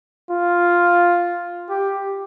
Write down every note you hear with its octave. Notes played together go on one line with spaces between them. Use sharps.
F4
G4